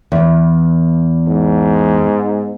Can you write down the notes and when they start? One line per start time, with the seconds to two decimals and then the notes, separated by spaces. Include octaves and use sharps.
0.12 E2
1.28 G#2